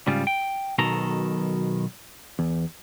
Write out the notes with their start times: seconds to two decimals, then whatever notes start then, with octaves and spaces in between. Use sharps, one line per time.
0.07 G#2 C#3 G3 F4
0.27 G5
0.78 B1 B2 D#3 A4 A#5
2.39 E2